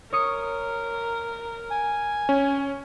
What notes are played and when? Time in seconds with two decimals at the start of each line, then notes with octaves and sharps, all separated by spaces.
0.13 A#4 C#5 D#6 C#7
1.71 G#5
2.29 C#4